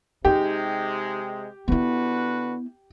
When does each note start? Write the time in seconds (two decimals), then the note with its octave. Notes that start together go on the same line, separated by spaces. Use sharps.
0.25 C3 G#3 D#4 G4
1.68 D3 B3 E4 F#4 B4